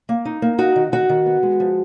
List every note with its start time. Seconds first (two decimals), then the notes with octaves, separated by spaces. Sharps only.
0.09 A#3
0.25 D#4
0.42 A#3
0.59 D#4 F#4 F#5
0.76 D#3
0.92 D#3 F#4 F#5
1.09 D#3
1.26 B3
1.43 G#3
1.60 F3